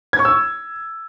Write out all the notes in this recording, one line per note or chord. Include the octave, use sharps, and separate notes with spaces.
G#6
C#6
E6